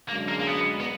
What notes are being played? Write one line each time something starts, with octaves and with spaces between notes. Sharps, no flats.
F#2 D3 G#3 A#3 D4
A#3
A#3
B3
B3